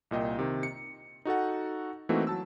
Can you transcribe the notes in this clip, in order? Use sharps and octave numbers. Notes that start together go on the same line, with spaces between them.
C2 A#2 D#5 G5
C3 D#3
C#7
D#4 F#4 A4 F#5
E3 A3 A#3 C4 D#4 F#4
F#3 A5 E6